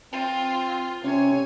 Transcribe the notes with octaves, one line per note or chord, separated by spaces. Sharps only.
C4 F4
C3 C#4 C#5 G#5